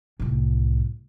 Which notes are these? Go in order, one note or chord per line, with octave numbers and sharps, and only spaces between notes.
C2 A2